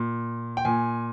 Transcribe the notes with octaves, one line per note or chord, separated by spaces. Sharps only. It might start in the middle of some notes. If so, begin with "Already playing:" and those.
Already playing: A#2
G5
A#2 G#5